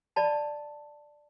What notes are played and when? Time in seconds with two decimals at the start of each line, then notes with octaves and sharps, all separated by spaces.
0.16 D5 D#5 A5 B5